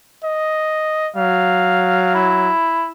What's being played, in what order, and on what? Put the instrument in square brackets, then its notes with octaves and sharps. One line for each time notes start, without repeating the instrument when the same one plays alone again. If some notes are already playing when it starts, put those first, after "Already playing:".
[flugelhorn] D#5
[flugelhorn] F#3 [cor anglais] F5
[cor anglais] E4